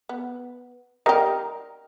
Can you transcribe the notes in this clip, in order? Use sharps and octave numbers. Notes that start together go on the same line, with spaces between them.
B3
G3 G4 A#4 D#5 A#5